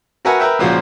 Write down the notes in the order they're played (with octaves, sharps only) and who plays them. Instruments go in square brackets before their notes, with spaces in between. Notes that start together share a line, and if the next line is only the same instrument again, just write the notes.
[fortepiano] F#4 A#4 B4 E5 F#5 G#5
A#4 B4 E5 G5
C#2 A#2 F3 F#4 C5